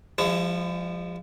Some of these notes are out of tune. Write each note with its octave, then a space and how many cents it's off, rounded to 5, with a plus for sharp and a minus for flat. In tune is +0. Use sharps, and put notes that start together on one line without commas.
F3 +0 G#3 -40 E4 +40